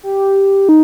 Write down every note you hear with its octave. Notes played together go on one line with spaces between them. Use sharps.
G4
D#4